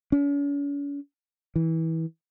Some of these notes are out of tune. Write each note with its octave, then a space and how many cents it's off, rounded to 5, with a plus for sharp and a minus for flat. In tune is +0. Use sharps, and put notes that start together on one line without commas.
C#4 +45
E3 -25